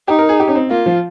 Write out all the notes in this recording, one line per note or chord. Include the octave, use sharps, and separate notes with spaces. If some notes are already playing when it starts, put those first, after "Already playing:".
D#4 G4
A#4
G#4
G4
C#4
C4
A#3 F4
F3